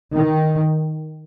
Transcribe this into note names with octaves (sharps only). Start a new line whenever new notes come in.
D#3